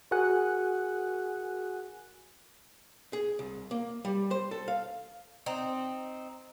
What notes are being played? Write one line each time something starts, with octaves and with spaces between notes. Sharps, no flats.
F#4 G#4 A#4 F#5 G#5 F#6
G#4
C2
A#3
G3
C5
A4
F5
C4 D#4